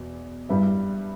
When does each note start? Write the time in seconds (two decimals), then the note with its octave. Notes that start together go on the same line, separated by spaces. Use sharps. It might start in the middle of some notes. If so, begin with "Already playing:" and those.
Already playing: E2 B2
0.49 G2 G3 E4 B4 E5